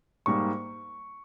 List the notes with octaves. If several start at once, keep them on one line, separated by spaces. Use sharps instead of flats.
G#2 G3 A#3 C#6